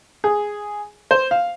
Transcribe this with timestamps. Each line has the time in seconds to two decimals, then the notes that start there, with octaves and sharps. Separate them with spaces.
0.24 G#4
1.11 C5
1.31 F5